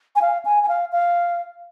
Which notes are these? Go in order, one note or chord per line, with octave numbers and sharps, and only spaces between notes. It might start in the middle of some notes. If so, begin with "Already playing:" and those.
G#5
F5
G#5
G#5
F5
F5